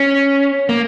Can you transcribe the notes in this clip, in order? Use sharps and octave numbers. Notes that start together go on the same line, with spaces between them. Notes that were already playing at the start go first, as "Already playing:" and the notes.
Already playing: C#4
A#3